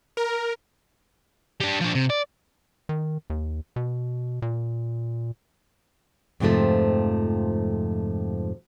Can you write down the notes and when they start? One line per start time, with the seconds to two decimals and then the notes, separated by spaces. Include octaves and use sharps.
0.17 A#4
1.60 G3 D4
1.81 F3 D4
1.95 C3
2.10 D5
2.89 D#3
3.30 D#2
3.76 B2
4.42 A#2
6.40 F2 G#2 C3 F3 A3